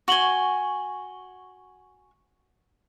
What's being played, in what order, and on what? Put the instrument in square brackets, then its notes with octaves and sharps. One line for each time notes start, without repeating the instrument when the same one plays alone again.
[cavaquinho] F#4 G#5 [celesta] C#6 F#7 G7